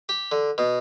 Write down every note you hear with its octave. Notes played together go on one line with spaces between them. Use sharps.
G4
D3
B2